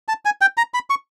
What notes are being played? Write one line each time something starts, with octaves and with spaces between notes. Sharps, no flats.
A5
G#5
G5
A#5
B5
C#6